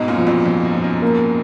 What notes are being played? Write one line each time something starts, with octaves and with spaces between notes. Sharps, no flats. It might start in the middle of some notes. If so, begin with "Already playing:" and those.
Already playing: G#2 B2 D#4
F#2 A#2
F3
F2
F2 F3
F#2
F3
F#2
A#3